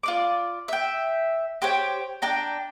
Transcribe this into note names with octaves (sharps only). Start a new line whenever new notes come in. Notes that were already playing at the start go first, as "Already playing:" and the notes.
F4 D5 D6
E5 G5
G4 C5 C#5 G5
D4 G5 A#5